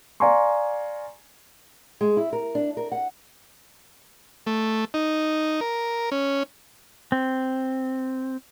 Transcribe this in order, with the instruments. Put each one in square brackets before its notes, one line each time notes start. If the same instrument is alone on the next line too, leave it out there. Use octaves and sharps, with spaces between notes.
[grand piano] D5 F5 G#5 A#5 C6 C#6
[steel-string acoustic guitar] G#3
E4
A#4
D4
A#4
F#5
[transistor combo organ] A3
D#4
A#4
C#4
[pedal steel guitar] C4